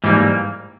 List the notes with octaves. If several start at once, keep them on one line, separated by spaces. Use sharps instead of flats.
G#2 E3 G3 A#3